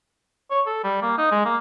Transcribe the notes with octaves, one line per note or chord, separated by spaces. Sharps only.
C#5
A4
G3
A#3
D#4
G#3
A#3